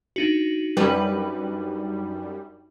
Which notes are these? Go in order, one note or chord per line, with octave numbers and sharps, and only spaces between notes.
D4 D#4 F#4
F#2 G3 B4